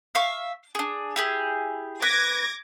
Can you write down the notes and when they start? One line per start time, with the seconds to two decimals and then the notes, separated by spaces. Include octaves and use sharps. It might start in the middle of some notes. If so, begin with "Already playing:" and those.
0.15 E5 F5 C#6
0.75 D4 G#4
1.16 E4 G4 G#4
2.02 B4 D6 G#6 A#6